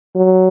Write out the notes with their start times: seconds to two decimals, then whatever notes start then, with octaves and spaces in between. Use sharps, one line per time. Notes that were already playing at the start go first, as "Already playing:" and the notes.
0.16 F#3